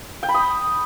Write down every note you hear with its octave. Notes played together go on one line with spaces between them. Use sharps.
G5
B5
D#6